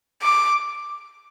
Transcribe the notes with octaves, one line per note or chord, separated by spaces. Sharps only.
D6